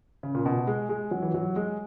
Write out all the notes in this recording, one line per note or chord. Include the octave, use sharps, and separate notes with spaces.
C#3
A#2
B2
G#3
G#3
F#3
E3
F#3
G#3